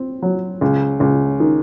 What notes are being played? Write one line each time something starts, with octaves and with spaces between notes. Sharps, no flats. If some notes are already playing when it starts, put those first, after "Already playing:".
Already playing: C4
F#3
C#2
C#2
D#3